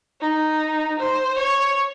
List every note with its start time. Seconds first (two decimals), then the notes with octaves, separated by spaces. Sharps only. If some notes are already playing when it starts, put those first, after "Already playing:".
0.20 D#4
0.99 C5
1.38 C#5